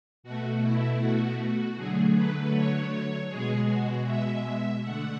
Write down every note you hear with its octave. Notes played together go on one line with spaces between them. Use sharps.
B2 A3 F#4
E4
F#4
F#4
D3 F#3 A3 G#4
B4
C#5
B2 G#3 G#4
F#4
E5
D3 A3 F#5